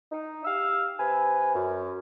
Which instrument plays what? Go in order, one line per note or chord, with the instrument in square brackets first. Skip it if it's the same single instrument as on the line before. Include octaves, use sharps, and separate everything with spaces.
[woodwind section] D#4
G4 F5 E6
C3 B4 G#5
F#2